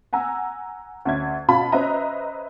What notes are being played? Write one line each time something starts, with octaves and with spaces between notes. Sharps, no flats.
F#5 G#5 A#5 E6
D2 C#4 E5 G#6
B2 C#4 F4 F#4 A5 B5
C#4 B4 C5 D#5 E5 A#5